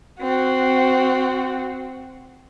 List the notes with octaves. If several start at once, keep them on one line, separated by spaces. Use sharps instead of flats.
C4 F#4